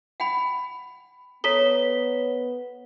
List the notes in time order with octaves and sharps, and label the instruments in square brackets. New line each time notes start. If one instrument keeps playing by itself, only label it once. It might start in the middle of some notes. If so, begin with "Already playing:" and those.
[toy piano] F#5 G5 B5
[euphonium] B3 [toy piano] A4 A#5 [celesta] C#5 B6 G7